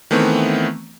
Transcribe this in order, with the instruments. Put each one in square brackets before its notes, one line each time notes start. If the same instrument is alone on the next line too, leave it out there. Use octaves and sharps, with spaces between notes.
[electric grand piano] D#3 E3 A3 B3 C4